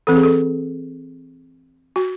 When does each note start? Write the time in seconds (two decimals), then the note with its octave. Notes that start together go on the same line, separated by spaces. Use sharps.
0.07 E3 C4 A4
0.16 G#4
0.23 A4
1.96 F#4